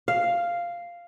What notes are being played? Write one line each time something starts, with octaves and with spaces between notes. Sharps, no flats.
F5